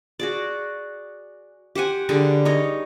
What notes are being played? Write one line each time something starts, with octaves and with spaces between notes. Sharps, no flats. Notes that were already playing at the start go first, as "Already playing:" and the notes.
F#4 G#4 D5
G4 C5 F#5 G#5
D3 G3 G#4 G#5
D#4 A#4 C#5 D#5